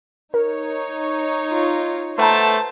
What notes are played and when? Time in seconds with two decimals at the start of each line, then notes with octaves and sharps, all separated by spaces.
0.34 D#4 A#4 C#5
1.49 F4
2.18 A3 B4 C5 F#5 A5 A#5